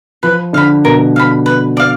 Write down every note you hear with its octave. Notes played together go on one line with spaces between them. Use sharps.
F3 B4
D3 F5 B5
B2 A#4
F5 B5
B4
D5 F5